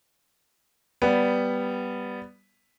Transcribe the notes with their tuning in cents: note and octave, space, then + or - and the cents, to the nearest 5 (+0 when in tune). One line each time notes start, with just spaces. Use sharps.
G3 +0 B3 +0